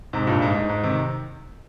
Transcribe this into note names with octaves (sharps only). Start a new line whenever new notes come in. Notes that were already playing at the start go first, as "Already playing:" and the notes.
G#2 C3
G2 A#2
G#2
G#2
G#2
C3 D#3